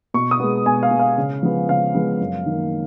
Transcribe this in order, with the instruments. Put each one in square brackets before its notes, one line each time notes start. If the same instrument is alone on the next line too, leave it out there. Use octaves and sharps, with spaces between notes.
[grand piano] B2 C#6
D#6
G#3 B3
B2 G#5
F5
G#3 B3
F5
C#3
F3 G#3 B3
C#3 F5
F3 G#3 B3
F#2
D#3 A#3